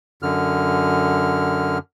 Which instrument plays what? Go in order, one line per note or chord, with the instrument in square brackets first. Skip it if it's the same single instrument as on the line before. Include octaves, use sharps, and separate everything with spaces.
[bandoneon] F#2 D3 F6